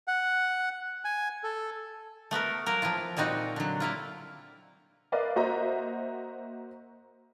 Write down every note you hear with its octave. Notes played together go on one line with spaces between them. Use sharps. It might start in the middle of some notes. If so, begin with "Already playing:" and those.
F#5
G#5
A4
A3 B3 F#4 A#4
F#3 A#3 A#4
F3 C4 E4 F4
A#2 G3 C4 D#4 F#4
D3 F#3
A#3 E4 F4
A#4 B4 D5 D#5 F5
A#3 F#4 C5 D#5 E5 A#5